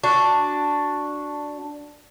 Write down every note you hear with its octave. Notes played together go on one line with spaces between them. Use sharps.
D4 F#4